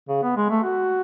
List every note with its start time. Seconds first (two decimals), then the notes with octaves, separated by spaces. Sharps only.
0.08 C#3
0.23 B3
0.36 G#3
0.50 A3
0.63 F#4